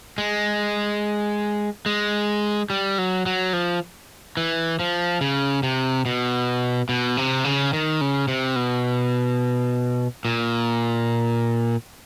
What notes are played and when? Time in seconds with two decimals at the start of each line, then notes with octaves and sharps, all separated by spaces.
0.18 G#3
1.86 G#3
2.70 G3
2.98 F#3
3.26 F#3
3.53 F3
4.37 E3
4.80 F3
5.21 C#3
5.63 C3
6.06 B2
6.89 B2
7.17 C3
7.44 C#3
7.73 D#3
8.01 C#3
8.28 C3
8.56 B2
10.25 A#2